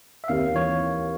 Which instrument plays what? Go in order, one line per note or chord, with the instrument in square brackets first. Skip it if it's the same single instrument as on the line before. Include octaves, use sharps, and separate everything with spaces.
[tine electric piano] E5
[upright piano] D#2 [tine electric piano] F5
[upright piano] E3 [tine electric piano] C#5